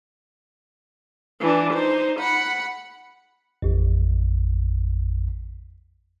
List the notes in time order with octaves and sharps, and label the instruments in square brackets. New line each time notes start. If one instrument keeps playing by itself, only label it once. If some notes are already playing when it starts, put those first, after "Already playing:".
[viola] E3 D4
D#4 C5
F#5 B5
[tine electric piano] A1 F2